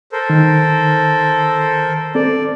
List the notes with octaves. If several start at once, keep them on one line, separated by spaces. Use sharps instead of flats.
A4 A#4 C5
D#3
C4 A4 D5